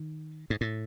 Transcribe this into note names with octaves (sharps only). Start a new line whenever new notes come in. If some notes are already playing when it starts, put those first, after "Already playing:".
Already playing: D#3
G#2
A2